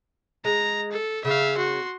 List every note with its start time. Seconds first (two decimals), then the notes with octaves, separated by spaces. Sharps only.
0.45 G#3 A#5
0.92 A4
1.25 C#3 E5 F5
1.57 F#4 C6